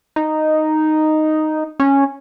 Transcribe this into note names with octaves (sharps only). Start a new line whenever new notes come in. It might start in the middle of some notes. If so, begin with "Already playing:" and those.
D#4
C#4